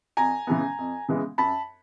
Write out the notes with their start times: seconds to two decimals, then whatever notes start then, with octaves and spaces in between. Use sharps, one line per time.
0.17 F2 G#5 A#5
0.47 C#3 E3 G#3 B3
0.79 F2
1.08 C#3 E3 G#3 B3
1.38 F#2 A5 B5